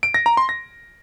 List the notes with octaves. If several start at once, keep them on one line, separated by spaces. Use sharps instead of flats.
D7
A#6
A#5
C6
A#6